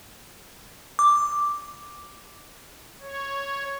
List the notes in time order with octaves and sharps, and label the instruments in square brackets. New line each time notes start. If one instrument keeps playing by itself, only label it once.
[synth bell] D6
[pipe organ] C#5